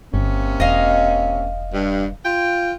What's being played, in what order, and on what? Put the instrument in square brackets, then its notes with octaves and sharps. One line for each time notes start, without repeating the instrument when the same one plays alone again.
[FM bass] G1 [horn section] C3 A#3 C#4
[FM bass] E1 [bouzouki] D#5 F5
[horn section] G2
F4 G5